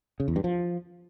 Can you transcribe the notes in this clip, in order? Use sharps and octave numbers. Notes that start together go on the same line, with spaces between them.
C#3
E2
G2
F3